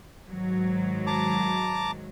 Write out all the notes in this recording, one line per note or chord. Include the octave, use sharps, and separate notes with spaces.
G#2 D#3 F#3
A5 A#5 D6